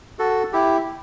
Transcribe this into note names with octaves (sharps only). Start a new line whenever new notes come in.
F#4 A4
E4 G4